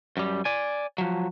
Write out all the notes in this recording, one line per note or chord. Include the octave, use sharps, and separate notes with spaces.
F#2 G3
D5 G#5
F3 F#3